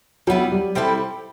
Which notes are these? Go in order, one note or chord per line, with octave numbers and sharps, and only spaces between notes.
F#3 G3 B3 E4
G3
G3 C4 E4 A4